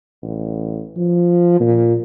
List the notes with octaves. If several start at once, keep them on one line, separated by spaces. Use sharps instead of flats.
A1
F3
A#2